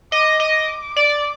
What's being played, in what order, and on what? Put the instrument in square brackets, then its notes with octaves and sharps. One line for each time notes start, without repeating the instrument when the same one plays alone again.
[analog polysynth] D#5 [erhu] D6
[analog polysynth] D#5
[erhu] D6
[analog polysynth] D5